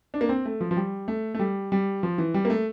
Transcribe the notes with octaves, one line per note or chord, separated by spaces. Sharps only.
D4
A#3
C4
A3
F3
F3
G3
A3
A3
G3
G3
F3
E3
G3
A#3
A3